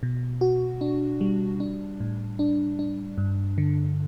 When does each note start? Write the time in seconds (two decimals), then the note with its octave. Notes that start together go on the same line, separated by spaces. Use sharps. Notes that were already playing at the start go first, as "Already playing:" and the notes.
0.03 B2
0.41 F#4
0.81 D4
1.21 G3
1.60 D4
2.00 A2
2.39 D4
2.79 D4
3.18 G2
3.58 D3